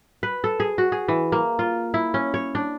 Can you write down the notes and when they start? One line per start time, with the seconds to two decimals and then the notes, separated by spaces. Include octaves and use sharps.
0.23 B4
0.44 A4
0.60 G#4
0.78 F#4
0.92 G#4
1.08 E3
1.32 A#3
1.59 F4
1.94 E4
2.14 C#4
2.34 C#5
2.55 D4